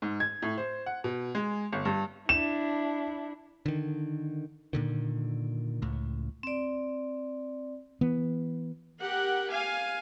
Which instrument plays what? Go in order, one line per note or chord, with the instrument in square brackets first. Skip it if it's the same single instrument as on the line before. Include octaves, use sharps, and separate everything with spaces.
[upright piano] G#2
G#6
A2
C5
F#5
B2
G#3
G1
G2
[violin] D4 E4 [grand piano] E7
[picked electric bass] D3 D#3
A#2 D3 D#3
C#2 A2
[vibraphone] C4 D5
[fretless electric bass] E3 B3
[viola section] G4 A#4 F#5
F5 G#5